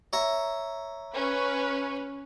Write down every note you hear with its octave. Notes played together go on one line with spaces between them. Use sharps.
C#5 E5 A#5
C#4 B4